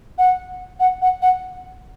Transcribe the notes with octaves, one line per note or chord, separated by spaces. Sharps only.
F#5
F#5
F#5
F#5